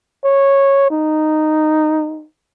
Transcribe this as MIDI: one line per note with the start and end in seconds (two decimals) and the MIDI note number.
0.24 0.90 73
0.90 2.25 63